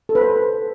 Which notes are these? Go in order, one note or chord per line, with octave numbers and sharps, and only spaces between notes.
A4
B4
C5